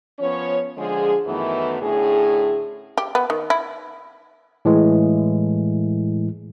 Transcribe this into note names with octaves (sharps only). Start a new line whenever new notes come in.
F3 B3 C#4 C#5
D3 F3 G#3 G#4
F#2 D#3 E3 A3 B3 E4
A2 D3 C#4 G#4
G4
B3
D#3
E4
A2 E3 G#3